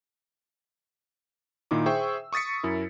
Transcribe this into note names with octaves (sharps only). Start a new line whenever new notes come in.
A#2 D#3 D#4 E4 D6
G#4 C5 E5 G5 C#6 E6
C#6 D#6 A6 B6 C#7
F#2 E4 A#4